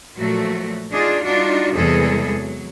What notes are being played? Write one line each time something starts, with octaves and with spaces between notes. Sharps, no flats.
A#2 F3 F#3 A3 F#4
D4 D#4 F4 G#4
G3 D4 D#4 F4 F#4
E2 C3 G3 G#3 G#4 A4
F#3